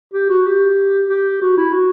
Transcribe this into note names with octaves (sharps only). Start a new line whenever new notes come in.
G4
F#4
G4
G4
F#4
E4
F#4